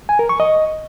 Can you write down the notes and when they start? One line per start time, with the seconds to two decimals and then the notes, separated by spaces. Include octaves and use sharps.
0.09 G#5
0.19 A#4
0.29 C#6
0.40 D#5